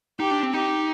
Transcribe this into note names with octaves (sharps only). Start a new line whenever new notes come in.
D#4 G4
D4
C4
D#4 G4